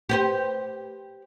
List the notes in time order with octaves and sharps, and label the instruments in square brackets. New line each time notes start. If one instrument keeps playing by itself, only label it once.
[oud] G4 B4 C5